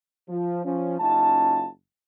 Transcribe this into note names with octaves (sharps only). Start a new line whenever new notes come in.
F3
F3 C#4
F#1 C#4 D#4 F4 A5